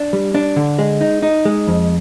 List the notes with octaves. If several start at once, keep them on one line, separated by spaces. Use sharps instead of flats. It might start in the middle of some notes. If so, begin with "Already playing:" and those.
Already playing: D4
G3
D4
D3
G#3
D#4
D#4
G#3
F2